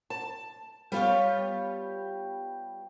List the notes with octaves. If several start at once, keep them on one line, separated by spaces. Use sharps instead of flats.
A5
G3 B3 F4 G4 C#5